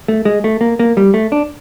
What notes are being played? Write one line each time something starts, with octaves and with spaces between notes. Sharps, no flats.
A3
G#3
A3
A#3
A#3
G3
A3
D4